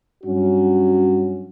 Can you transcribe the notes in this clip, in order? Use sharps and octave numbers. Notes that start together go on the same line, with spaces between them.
G2 F#3 C#4 F#4